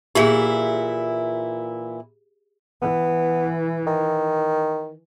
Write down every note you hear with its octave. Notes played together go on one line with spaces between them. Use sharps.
A#2 E3 E4 G4 G#4
E3 B3
D#3